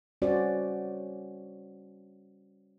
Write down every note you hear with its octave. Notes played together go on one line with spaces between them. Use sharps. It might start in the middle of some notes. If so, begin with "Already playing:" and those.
G3 C#4 F#4 C5 D5